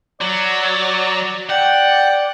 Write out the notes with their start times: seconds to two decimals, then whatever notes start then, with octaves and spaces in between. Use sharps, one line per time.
0.21 F#3 D5
1.49 D5 F#5 G5